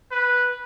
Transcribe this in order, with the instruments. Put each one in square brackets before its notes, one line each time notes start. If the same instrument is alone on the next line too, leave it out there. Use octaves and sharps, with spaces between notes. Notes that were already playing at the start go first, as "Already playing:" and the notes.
[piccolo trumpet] B4